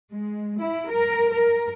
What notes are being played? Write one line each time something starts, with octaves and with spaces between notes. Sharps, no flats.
G#3
E4
A#4
A#4